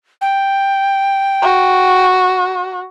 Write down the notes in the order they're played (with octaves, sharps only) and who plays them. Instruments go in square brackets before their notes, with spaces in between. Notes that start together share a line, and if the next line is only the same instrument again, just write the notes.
[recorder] G5
[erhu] F#4